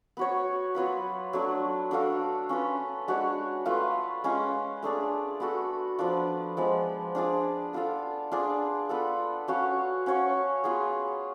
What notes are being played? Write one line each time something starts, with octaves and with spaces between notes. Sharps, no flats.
B3 F#4 C#5
F#3 B3 F4 B4
F#3 A3 D4
D4 F#4 A4 F5
C#4 F4 B4
G#3 D4 F#4 C#5
A3 F4 B4 F5
G#3 C#4 F4
A3 D4 G#4 D5
B3 F#4 A4
F3 B3 D4 F4
F3 G#3 B3
D4 F4 G#4 D5
B3 F4 A4 F5
D4 F4 G#4 D5
B3 F4 A4
C#4 F#4 C#5 F5
C#4 F#4 C#5 F5
B3 F4 G#4